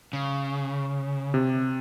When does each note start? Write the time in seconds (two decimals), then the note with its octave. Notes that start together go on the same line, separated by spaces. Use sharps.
0.13 C#3
1.34 C3